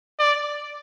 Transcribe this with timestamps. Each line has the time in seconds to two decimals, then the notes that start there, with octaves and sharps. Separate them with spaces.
0.19 D5